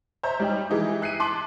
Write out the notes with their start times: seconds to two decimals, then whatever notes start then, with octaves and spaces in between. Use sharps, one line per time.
0.23 C5 C#5 E5 A#5 G6
0.40 G3 D#4 G5
0.70 E3 G#3 D#4 E4 G4 G#4
1.02 E5 F#6 C7 C#7 D#7
1.20 A5 C6 D6 F#6 B6 F#7